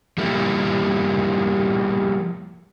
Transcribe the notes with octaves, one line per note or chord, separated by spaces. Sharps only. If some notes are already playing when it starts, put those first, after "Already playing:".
F3 G3 A#3 E4